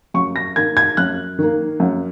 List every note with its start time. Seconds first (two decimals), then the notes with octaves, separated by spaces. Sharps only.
0.14 F#2 C#6
0.36 A#6
0.56 D#3 A#3 G#6
0.77 G#6
0.97 F#2 F#6
1.39 D#3 A#3
1.80 F#2